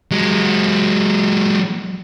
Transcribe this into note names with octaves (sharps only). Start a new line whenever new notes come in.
F#3 G#3